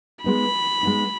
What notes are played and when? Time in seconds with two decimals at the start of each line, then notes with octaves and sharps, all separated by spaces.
0.24 G#3 B3 D#4 B5
0.83 G#3 B3 D#4